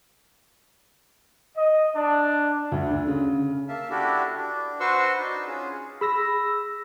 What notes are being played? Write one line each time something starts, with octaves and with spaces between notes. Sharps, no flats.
D#5
D4
D2
D3
C#3
A#3 E5 F5 A5
D4 E4 F#4 G4 A4
D4
F#4 B4 C5 C6 C#6 E6
D4 D#4 A5
C#4 F4 G#4
G#4 B5 E6 A#6